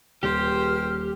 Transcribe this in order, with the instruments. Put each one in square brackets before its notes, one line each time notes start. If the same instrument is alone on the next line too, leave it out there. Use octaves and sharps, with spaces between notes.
[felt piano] D#1 [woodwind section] C#2 F6 [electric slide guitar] G4 [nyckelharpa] C5 G5